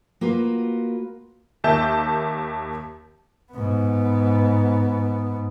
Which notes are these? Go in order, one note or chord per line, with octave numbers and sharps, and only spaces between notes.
A#3 F4 F#4 B4
D#2 A#3 E5 A5 G6
G#2 B3